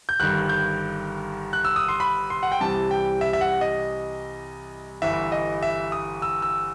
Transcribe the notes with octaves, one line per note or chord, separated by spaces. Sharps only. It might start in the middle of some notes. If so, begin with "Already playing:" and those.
G6
G1 G2 D#3 F#6
G6
F#6
E6
D#6
C6
B5
C6
F#5
G5
C2 C3 E3 G3 A5
G5
E5
E5
F#5
D#5
G1 G2 E3 E5
D#5
E5
D#6
E6
E6